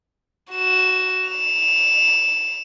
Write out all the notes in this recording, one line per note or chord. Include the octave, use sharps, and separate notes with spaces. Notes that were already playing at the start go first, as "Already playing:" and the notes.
F#4 E7
E7 F7